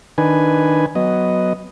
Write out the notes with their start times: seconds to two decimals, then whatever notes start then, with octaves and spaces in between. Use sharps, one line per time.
0.18 D#3 D4 B4 G#5
0.95 F#3 B3 D#5